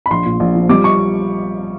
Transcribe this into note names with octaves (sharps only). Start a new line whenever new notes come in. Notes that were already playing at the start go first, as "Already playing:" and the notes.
B5
A#1 C6
A#2
A#1
F3
G3 D6
C#6